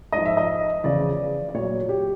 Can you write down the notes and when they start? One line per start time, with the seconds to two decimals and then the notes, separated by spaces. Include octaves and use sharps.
0.12 G#2 F3 D#5
0.25 E5
0.37 D#5
0.83 E2 C#3 F3 D5
1.49 D5
1.54 A#2 F#3 C#5
1.89 G4